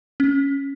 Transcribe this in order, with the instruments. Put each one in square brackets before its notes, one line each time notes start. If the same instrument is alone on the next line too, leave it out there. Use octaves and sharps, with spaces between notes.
[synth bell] C#4